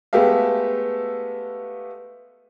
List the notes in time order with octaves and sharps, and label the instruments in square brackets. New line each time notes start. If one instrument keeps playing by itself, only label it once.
[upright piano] G#3 A3 B3 G4 E5 F5